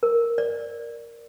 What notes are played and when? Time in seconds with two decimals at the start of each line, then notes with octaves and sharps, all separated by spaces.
0.03 A#4
0.38 D5